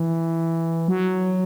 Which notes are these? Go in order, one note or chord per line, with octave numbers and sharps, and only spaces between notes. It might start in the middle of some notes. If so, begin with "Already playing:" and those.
Already playing: E3
F#3